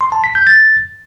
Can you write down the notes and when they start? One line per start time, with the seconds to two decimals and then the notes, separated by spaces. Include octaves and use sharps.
0.01 C6
0.12 A5
0.24 B6
0.35 G6
0.47 A6